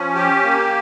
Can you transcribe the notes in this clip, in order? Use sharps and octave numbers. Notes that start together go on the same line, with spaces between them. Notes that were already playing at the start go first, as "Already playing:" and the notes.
Already playing: F3 C#4
G4
A#3